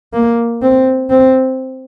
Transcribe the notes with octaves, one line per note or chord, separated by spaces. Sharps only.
A#3
C4
C4